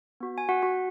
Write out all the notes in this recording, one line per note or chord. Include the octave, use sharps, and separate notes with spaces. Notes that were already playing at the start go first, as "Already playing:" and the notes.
B3 F#4
G#5
F#4 F#5
F#4 F#5